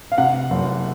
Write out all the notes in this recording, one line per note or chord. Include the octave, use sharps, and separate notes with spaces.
F5
C3 F#5
F#1